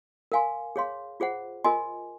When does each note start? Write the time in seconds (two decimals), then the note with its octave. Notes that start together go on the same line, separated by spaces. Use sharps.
0.32 A#4 F5 G#5 C6
0.76 G#4 C#5 F5 C6
1.20 F4 G#4 C5 F#5
1.64 F4 A#4 D#5 G#5 C6